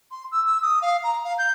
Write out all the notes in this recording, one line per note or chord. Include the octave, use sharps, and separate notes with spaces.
C6
E6
E6
D#6
F5
A#5
F5
G6